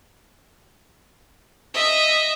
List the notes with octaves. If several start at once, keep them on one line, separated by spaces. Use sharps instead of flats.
D#5 E5